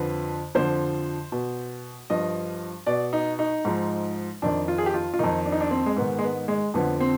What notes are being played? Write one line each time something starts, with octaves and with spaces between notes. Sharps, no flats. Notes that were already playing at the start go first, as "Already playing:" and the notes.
Already playing: F2 D3 F3 B4
F2 D3 F3 C5
B2
G2 F3 D#5
B2 D5
D#4
D#4
G#2 F3
F2 D#3 D4
F4
G#4
G4
F4
F4
F2 D#3 D#4
D4
D#4
D4
C4
G#3
G#2 D#3 B3
G#3
B3
G#3
F2 D3 F3 B3
C4